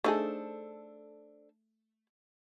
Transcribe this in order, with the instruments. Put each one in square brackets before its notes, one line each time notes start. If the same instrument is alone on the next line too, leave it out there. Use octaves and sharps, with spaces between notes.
[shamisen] A3 D#4 G#4 [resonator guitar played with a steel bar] D4 A4 C5